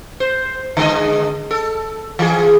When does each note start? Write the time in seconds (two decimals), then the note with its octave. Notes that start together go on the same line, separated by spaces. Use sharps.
0.20 C5
0.77 D3 G#3 D#5
1.51 A4
2.19 E3 G#4